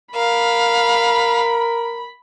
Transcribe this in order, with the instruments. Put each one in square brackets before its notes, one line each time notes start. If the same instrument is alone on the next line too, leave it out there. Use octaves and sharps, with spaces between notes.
[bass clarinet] A#4 [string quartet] F5 [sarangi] B5